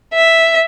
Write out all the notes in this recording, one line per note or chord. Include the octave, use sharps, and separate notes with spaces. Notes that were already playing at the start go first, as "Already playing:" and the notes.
E5